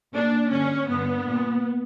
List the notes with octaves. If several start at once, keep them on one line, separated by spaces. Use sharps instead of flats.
A#2 D4
G2 D3 C#4
G2 D3 B3
A#2